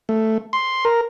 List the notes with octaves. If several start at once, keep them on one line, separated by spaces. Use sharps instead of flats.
A3
C6
A#4